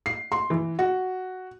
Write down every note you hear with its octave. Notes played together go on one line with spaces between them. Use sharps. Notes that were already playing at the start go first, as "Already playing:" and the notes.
C7
C6
E3
F#4